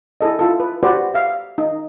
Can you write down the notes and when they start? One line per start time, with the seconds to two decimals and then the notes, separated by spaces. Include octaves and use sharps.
0.21 E4 G#4 A4 D#5
0.39 E4 F4 A4
0.60 B4
0.83 F#4 G4 B4 C5 D5
1.14 E5 F5
1.58 D#4